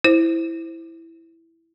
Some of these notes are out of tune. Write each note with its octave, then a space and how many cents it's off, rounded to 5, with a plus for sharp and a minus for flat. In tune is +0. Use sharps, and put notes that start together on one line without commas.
E4 +0 C5 +0